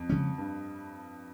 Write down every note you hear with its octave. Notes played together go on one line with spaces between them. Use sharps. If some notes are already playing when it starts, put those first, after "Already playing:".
Already playing: F2
C#3 F3 G#3 C#4
G2